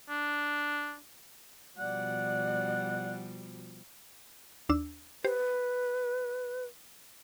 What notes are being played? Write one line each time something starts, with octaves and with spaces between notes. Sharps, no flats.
D4
B2 F3 G3 D5 F#5
D#2 D4 E6
G4 B4 C5